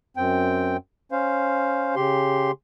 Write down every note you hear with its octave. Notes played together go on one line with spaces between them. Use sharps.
F#2 C4 G5
C#4 C5 F5
C#3 G4 C6